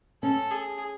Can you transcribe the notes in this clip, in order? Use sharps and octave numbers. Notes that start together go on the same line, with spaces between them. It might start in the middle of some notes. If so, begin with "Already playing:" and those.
C#4 A4
G#4